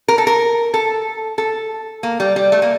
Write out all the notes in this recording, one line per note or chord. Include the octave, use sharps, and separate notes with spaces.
A#4
A4
A#4
A4
A4
A#3
G3
G3
A3
A#3